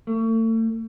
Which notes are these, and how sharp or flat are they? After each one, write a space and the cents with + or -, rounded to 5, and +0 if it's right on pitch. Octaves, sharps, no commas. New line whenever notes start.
A3 +40